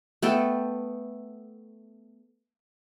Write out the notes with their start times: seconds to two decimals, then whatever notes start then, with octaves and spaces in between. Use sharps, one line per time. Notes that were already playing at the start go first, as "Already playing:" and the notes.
0.22 A3 B3 A4 G5